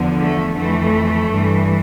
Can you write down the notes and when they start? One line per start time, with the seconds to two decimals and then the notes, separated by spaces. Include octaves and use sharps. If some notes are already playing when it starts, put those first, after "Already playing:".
Already playing: E2 D3 F3
0.22 A3
0.58 F2 E3 A3
1.31 G2 E3